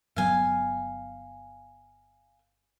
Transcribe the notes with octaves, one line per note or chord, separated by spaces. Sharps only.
G1 F#3 B3 F5 G#5